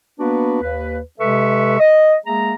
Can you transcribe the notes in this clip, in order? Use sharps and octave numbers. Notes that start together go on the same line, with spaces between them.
A#3 B3 D4 F#4 B4
D#2 B4
C3 G#3 A4 B4 E5 C#6
D#5
G#3 A#3 G#4 E5 A#5